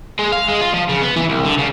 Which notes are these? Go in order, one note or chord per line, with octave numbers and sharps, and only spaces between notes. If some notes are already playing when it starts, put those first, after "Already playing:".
G#3
F5
G#3
F4
F3
C#3
B3
E3
C2
D3
C#3